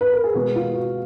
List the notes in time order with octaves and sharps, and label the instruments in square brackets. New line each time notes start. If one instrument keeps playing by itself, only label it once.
[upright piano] B4
A#4
G#4
B2 G#3 B3 F#4
F4
F#4